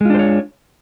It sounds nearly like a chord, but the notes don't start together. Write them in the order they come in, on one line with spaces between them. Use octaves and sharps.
G#3 F4 D4 C5 C#5